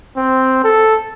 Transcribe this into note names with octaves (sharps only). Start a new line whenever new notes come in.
C4
A4